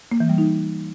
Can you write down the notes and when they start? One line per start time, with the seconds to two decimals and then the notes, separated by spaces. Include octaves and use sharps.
0.11 A#3
0.20 E3
0.29 G3
0.38 D#4